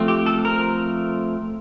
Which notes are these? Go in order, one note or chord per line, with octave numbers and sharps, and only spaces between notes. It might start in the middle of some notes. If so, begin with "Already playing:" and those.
Already playing: F3 A3 C4
G4
A4
A#4